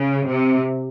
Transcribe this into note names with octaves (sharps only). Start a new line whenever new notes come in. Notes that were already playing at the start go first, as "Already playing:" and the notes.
Already playing: C#3
C3